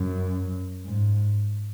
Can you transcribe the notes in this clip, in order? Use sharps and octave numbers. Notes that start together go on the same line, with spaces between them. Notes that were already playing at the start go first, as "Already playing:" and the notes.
Already playing: F#2
G#2